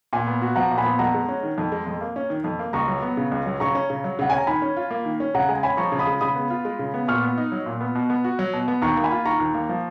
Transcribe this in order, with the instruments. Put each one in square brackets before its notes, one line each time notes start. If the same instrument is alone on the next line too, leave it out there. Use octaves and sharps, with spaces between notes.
[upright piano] A#2 [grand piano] G#5
[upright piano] B3
F#4
[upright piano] F3 [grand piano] F#5 A#5
[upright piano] A#2
[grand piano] G#5 B5
[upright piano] B3
[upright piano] F2 [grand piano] F#5 A#5
[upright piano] G#3
C#4
D#3
F2
G#3
F2
A#3
C#4
D#3
F2
A#3
[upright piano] C#2 [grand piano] A#5 C#6
[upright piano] F#3
B3
C#3
C#2
F#3
[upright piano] C#3 [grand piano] A#5 C#6
[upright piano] C#4
C#3
F#3
[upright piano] C#3 [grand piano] F#5
[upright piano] C#4 [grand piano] G#5
[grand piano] A#5
[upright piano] D#3 [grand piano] G#5 B5
[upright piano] C#4
F4
A#3
D#3
C#4
[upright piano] C#3 [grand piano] F#5 A#5
[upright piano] G#3 [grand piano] G#5
[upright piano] C#4 [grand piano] G#5 B5
[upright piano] F3 [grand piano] A#5 C#6
[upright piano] C#3
[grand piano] B5 D#6
[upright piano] G#3
[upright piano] C#3 [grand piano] B5 D#6
[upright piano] B3
F4
G#3
C#3
B3
[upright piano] A#2 [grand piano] C#6 F6
[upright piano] B3
D#4
F#3
A#2
B3
B2
B3
F#4
F#3
B2
B3
[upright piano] D#2 [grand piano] A#5 C#6
[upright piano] A#3
[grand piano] G#5 B5
[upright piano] F4
[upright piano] D#3 [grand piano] A#5 C#6
[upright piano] D#2
A#3
F3